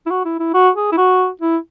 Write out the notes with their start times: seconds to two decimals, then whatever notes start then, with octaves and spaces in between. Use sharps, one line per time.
0.06 E4
0.10 F#4
0.25 E4
0.39 E4
0.54 F#4
0.76 G#4
0.92 E4
0.97 F#4
1.42 E4